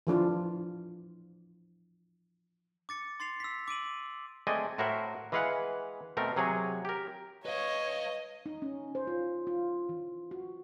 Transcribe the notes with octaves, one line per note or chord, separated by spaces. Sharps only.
E3 F3 D4 F4
D6 A6 C#7
C6 A6 C7 F7
E6 B6
D6 D7 D#7 F#7
G#3 A3 C4 D5 D#5 G#5
A2 E4 F#4 A#4 C5 E5
E3 G#3 B4 F5 F#5
B2 A3 C4 A#4
C3 F#3 G#4 C#5 G#5
G4 A#4
B4 C#5 D#5 F5
D#4
C#4
C5
F4
F4
E3
F#4